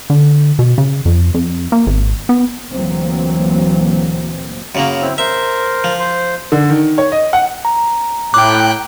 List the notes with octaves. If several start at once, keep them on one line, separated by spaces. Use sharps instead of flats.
D3
B2
C#3
F2
F2
A#3
G#1
B3
D2 A#2 E3 F#3 A#3 C4
F#2 C#3 A#3
C4 E4
A#4 C5 E5
F3
C5
D3
D#3
C#5
D#5
F#5
A#5
A2 G5 D6 F#6